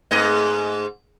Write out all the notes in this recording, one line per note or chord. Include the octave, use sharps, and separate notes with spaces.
G#2 A3 D#5